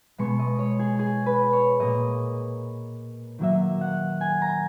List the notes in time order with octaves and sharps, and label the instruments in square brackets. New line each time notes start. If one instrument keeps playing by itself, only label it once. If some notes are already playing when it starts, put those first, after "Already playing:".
[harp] B2 G#3 B3 C#6
D#5
C#5
G#4
G#4
B4
C#5
A#2 A#3 D#5
D#3 F#3 A#3 E5
F#5
G#5
A#5